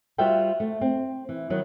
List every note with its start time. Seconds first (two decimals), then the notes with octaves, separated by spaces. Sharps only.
0.18 G3 F4 F#4 C5 E5 G5
0.60 A3
0.81 C4
1.29 E3
1.50 D#3 F#3 B3